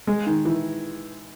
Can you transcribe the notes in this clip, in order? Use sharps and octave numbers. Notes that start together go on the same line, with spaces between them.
G#3
D#3
E3